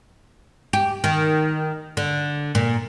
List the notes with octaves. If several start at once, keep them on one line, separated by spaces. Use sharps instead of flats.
G4
D#3
D3
A#2